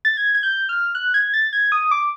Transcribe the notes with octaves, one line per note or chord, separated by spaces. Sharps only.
A6
G#6
G#6
G6
F6
F#6
G#6
A6
G#6
D#6
D6